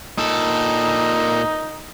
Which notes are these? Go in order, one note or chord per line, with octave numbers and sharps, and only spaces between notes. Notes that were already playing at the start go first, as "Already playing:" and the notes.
A#2 D#4 A4